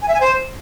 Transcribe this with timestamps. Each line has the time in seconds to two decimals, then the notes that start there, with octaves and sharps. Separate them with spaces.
0.02 G#5
0.08 E5
0.14 G#5
0.20 C5